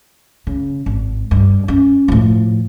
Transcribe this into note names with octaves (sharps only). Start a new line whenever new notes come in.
C#3
G#1
G2
C#4
A2 F3